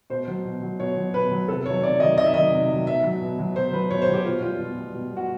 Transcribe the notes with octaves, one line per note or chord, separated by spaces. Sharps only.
B2 C5
F#3
B2
F#3
B2 C#5
F#3
B2 B4
F#3
C3 A4
D#3 F#3 C#5
C3 D5
D#3 F#3 D#5
C3 D#5
E5
D#3 F#3 D#5
C3
D#3 F#3
B2 E5
F#3
B2
F#3
B2 C5
F#3 B4
B2 C#5
C5
F#3
G4
B2 F4
G3 F4
B2
G3
B2
G3 F#4